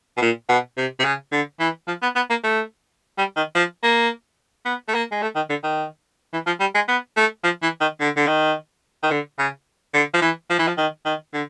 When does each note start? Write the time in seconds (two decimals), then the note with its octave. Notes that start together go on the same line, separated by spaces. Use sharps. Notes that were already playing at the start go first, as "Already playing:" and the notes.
0.17 B2
0.22 A#2
0.49 B2
0.77 C3
1.00 C3
1.04 C#3
1.32 D3
1.60 E3
1.88 F3
2.02 B3
2.16 B3
2.30 A#3
2.44 A3
3.18 G3
3.36 D#3
3.55 F3
3.83 A#3
4.65 B3
4.88 A3
4.94 A#3
5.12 G#3
5.22 A3
5.36 D#3
5.49 D3
5.63 D#3
6.33 E3
6.46 F3
6.60 G3
6.75 G#3
6.88 B3
7.17 A3
7.44 F3
7.62 E3
7.81 D#3
8.00 D3
8.17 D3
8.27 D#3
9.03 D#3
9.11 D3
9.39 C#3
9.94 D3
10.14 F3
10.22 E3
10.50 F3
10.59 E3
10.67 F3
10.78 D#3
11.05 D#3
11.33 D3